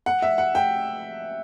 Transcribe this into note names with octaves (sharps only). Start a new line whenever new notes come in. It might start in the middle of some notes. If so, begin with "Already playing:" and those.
F#5
E5
F#5
G5